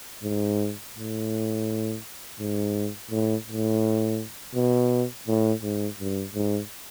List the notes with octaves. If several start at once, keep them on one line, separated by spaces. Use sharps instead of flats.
G#2
A2
G#2
A2
A2
B2
A2
G#2
G2
G#2